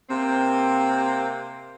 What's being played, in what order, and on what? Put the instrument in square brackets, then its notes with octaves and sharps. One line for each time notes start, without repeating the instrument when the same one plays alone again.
[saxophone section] C3 A#3 C4